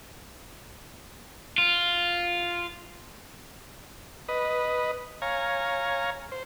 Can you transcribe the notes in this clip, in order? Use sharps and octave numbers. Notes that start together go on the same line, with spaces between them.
F4
B4 D#5
C#5 F5 G#5 A#5
C5